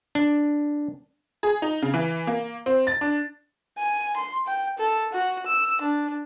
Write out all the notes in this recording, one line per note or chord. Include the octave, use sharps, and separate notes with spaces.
D4
G#4
D#4
C#3
E3
A#3
C4
A6
D4
G#5
C6
G5
A4
F#4
E6
D4